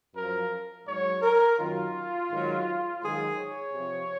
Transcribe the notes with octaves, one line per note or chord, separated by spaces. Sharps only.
F#2 F3 A#4
G#2 F#3 C#5
A#4
F#2 D#3 F#3 F4
G#2 D#3 F#3
G#2 D#3 F#3 G#4
C#5
C3 F3